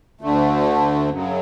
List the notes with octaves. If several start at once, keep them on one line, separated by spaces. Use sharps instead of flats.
D2 D3 A3
F#2 C#3 F#3